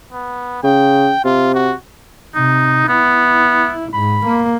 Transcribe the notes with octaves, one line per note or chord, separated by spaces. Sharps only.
B3
C#3 G5
C3 F4
F#4
C3 D#4
B3 E4
G#2 B5
A#3